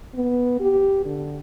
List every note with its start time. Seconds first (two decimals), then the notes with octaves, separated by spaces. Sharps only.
0.15 B3
0.60 G4
1.05 D3